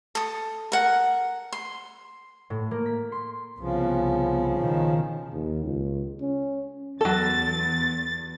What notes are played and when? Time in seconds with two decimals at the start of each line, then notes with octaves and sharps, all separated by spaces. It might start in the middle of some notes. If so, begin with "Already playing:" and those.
0.15 A4 D#6
0.72 A#4 F#5
1.52 C6
2.50 A2
2.71 A#3
2.86 B6
3.12 C6
3.60 C2 C#3 F3 B3
4.57 B2 D#3
5.33 D#2
5.65 C#2
6.21 C#4
7.01 E2 F#3 A4 A6